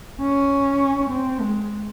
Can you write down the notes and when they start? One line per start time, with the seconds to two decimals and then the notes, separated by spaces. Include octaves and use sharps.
0.21 C#4
1.11 C4
1.40 G#3